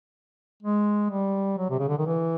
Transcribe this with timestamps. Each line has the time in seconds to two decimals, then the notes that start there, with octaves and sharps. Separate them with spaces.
0.63 G#3
1.10 G3
1.58 F#3
1.70 C3
1.79 C#3
1.88 D3
1.98 D#3
2.07 E3